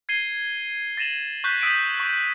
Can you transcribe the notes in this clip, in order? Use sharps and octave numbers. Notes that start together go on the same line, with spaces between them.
G#6 C7 D#7 G7
A6 A#6 D#7 E7 F#7
C#6 F#6 G6 B6
D#6 E6 B6 D7 D#7
C#6